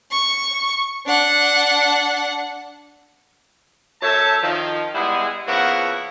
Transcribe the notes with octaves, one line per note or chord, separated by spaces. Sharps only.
C#6
D4 F#5
F#2 A4 C5 C#5 E5 A5
D#3 F3
G3 G#3 B3 E4 G#4
C#3 F3 A#3 B3 E4 F#4